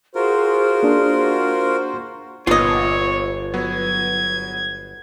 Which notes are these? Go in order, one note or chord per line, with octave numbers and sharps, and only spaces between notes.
F4 F#4 G#4 A#4 C5
A#3 D4
G1 A#2 B3 F4 C#5 D#5
F#3 B3 G#6